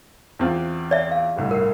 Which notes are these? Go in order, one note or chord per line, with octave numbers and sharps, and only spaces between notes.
E2 C4 F4
D5 E5
F5
G1 C2 A2
A#4 F#5